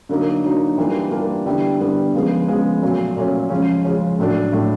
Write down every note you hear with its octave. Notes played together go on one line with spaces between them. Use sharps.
D3 F#3 A#3 D#4
D3 F#3 A#3 D#4
E3 G3 A#3 D4 F4
E3 G3 A#3 D4 F4
D3 G3 B3 E4
D3 G3 B3 E4
C#3 F3 G#3 B3
C#3 F3 G#3 B3
A#2 F#3 A3 C#4
A#2 F#3 A3 C#4
C#3 F3 G#3 C#4
C#3 F3 G#3 C#4
A2 F#3 A3 D4
A2 F#3 A3 D4